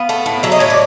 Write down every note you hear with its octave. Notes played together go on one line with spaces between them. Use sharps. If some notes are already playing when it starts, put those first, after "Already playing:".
Already playing: B3 F5
A3
A2
F#3 E5
D#5
A2 C#5
D5